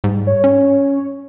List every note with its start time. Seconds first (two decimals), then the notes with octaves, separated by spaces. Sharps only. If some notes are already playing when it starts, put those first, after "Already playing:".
0.04 G#2 G3
0.27 C#5
0.44 C#4